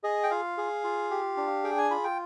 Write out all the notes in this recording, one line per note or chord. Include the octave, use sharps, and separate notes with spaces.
G#4 D#5
G5
F4 F5
G#4
F4
G4
D4
G#4 G5
G#5
F4 B5
G5